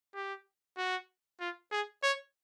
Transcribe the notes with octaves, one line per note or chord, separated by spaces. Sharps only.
G4
F#4
F4
G#4
C#5